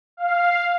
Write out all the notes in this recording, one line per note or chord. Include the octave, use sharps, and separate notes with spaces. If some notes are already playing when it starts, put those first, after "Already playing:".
F5